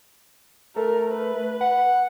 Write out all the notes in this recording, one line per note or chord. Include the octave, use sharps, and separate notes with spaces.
A3 A#4
B4
F#5